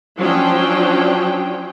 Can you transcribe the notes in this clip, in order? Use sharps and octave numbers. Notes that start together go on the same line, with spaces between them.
F3 F#3 C#4 D4 G5